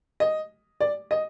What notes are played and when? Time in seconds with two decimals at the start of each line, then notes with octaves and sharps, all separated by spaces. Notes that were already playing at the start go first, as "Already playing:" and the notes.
0.20 D#5
0.80 D5
1.11 D#5